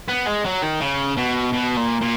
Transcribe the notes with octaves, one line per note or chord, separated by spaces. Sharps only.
B3
G#3
F#3
D#3
C#3
B2
B2
A#2
A#2